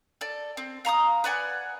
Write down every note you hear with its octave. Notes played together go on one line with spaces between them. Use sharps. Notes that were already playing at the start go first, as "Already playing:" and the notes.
A4 D5
C4
F5 A#5 C#6 D#6
B4 D5 F#5 G#5